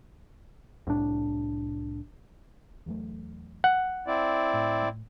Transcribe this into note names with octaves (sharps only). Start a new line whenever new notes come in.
C2 A2 D4
E2 F#3 A3
F#5
C4 E4 D5
A2